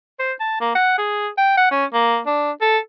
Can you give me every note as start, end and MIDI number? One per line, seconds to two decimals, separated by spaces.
0.19 0.33 72
0.40 0.56 81
0.61 0.72 58
0.75 0.93 78
0.98 1.28 68
1.38 1.56 79
1.57 1.68 78
1.71 1.85 61
1.94 2.19 58
2.26 2.52 62
2.61 2.78 69